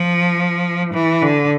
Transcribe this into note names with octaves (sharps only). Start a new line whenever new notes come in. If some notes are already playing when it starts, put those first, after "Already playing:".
Already playing: F3
E3
D3